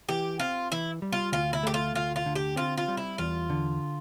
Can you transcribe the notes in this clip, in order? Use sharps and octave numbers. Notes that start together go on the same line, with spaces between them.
E3 G4
C4 F4
E3 E4
G3
F4
D2 F4
E4
A3 G4
F4
D2 F4
F4
D3
G4
C4 F4
F4
G3
E4
E2 F4
D3